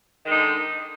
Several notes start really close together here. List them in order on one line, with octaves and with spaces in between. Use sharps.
D#3 G#3 D#4 D3